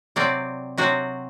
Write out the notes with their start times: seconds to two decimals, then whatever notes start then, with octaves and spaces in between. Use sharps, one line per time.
0.16 C3 F#3 C4 D5
0.78 C3 F#3 C4 F#4